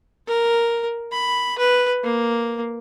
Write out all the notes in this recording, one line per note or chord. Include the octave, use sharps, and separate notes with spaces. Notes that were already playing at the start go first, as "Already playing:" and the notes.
A#4
B5
B4
A#3